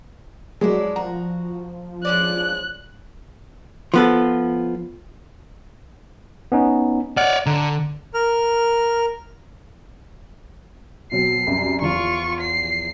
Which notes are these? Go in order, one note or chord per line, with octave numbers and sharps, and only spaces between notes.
F#3 G#3 D4 E4
F3 F#4 A#5
G#3 C#4 D5 F#6
F3 B3 A4
B3 C#4 D#4
C#5 D5 F#5 F6
D3 A#5
A#4 F6
B2 F#3 C4 C7
C2 F#2
E2 F3 F4 C#6
C7